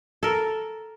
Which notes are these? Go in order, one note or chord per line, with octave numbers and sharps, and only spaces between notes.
A4 A#4